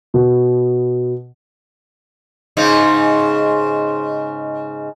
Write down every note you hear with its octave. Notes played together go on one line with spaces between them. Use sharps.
B2
G#2 C#3 D#4